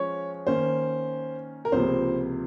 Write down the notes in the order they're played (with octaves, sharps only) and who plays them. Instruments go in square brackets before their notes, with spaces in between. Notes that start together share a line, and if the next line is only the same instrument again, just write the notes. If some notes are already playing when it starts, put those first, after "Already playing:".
Already playing: [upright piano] F3 G#3 C#4 F4 [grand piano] C#5
[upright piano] D#3 A#3 C#4 [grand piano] C5
[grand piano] A#4
[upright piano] C#2 C3 F3 A#3 [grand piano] C5